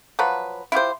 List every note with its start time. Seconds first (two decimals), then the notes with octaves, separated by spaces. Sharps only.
0.19 F3 F#3 B4
0.72 E4 F4 G4 C5